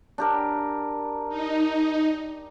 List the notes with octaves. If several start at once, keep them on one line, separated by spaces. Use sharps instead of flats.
D4 G4 A#4
D#4